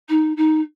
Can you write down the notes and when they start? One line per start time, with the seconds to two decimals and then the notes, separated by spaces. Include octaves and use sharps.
0.09 D#4
0.36 D#4